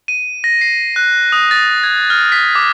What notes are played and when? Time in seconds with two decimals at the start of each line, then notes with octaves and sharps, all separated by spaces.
0.08 D#7
0.44 A#6
0.61 C7
0.96 F#6
1.32 D#6
1.51 A6
1.83 G#6
2.10 F6
2.32 B6
2.55 D6